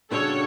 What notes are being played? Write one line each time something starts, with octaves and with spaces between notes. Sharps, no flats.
C#3 G3 D4 F#4 A4 C#5